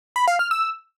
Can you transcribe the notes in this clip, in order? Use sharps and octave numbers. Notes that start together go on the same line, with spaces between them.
B5
F5
F6
E6